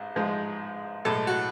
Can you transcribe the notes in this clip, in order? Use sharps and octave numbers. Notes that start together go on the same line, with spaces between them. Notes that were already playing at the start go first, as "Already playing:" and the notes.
Already playing: A1 G#2
A1 G#2 F3 G#3
B1 A2 G#3 A4
F#4